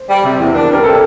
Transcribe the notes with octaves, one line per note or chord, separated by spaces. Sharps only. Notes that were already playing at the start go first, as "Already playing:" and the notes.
Already playing: C5
G3
C3
E2
D4 A#4
G3 A#4
C3 A4